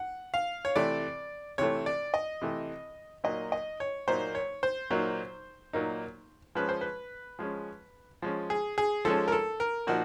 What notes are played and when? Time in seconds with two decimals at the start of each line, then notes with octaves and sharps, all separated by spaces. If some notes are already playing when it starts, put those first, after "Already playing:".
Already playing: F#5
0.34 F5
0.65 C#5
0.76 C3 E3 A3 D5
1.58 C3 E3 A3 C#5
1.86 D5
2.14 D#5
2.41 C3 E3 A3
3.24 A#2 F#3 A#3 D#4 D#5
3.52 D#5
3.80 C#5
4.08 A#2 F#3 A#3 D#4 C5
4.35 C#5
4.63 C5
4.90 A#2 F#3 A#3 D#4
5.73 A#2 F#3 A#3 D#4
6.55 F3 G#3 C#4 B4
6.69 C5
6.81 B4
7.39 F3 G#3 C#4
8.22 F3 G#3 C#4
8.50 G#4
8.78 G#4
9.05 F3 G#3 C#4 A4
9.28 A#4
9.32 A4
9.60 A#4
9.87 A#2 F3 A#3 D#4 F#4